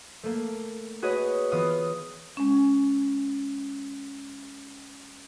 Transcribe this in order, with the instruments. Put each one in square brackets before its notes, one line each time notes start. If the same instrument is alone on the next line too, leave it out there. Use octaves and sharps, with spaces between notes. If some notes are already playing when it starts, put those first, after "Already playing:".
[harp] A3 A#3
F#4 G#4 B4 C#5 D#5
E3 B3 F4 D#6 F6
[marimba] G#3 C#4